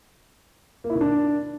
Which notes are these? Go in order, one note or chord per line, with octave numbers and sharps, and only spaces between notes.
A#3
E4
D#3
D4